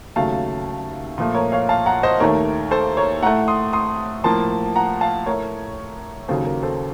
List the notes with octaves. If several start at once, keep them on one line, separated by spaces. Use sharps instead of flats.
D#2 C#3 F#3 A3 F5 A5
A#2 F3 A3
A#4 C#5
C#5 F5
F5 A5
F#5 A#5
C5 D#5
D#2 D#3 A3 A#4 C#5
A4 C5
A#4 C#5
A2 A3 F#5 A#5
C6 D#6
C6 D#6
A2 F3 A#3 A5 C6
F#5 A#5
F5 A5
A2 A3 A#4 C#5
D#2 C#3 F#3 A4 C5
A#4
A4 C5